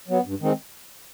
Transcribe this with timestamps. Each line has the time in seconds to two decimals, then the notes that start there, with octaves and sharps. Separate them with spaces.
0.08 F#3 B3
0.25 G2
0.41 D#3 G#3 C4